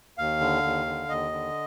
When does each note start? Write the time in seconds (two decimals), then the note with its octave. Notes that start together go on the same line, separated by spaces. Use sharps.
0.18 D#2 F5
0.40 D3
0.63 D#2
0.86 D3
1.08 D#2 D#5
1.31 D3